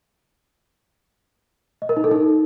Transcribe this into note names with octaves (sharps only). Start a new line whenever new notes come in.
D#5
A#4
D#4
A4
D#4